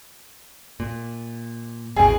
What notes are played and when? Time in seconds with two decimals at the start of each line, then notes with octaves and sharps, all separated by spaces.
0.80 A#2
1.96 A1 E2 B2 G#4